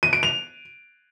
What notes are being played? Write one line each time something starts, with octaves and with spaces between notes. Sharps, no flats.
D#7
D7
F7